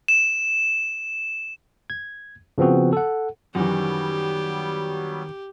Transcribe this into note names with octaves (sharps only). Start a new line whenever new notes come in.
E7
G#6
C#3 F3 B3 C4 F#4
A4 F#5
F#2 D#3 E3 F#3 G3 B3 G4